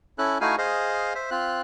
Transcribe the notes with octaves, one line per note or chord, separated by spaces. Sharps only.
C#4 E4 A4 F#6
A3 D#4 E4 F#4 F5 G#5
G#4 C5 D#5 F5
C5 E5
C4 F4 F#6